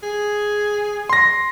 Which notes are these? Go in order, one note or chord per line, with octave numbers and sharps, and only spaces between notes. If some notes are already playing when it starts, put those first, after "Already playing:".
G#4
C6 A#6